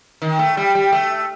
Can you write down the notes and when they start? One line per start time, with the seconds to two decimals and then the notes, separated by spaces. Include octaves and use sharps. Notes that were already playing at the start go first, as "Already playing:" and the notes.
0.22 D#3
0.39 A3
0.57 G3
0.75 G3
0.92 A3